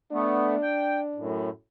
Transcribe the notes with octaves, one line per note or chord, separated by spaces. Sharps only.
A3 B3 D4
G5
F#2 A2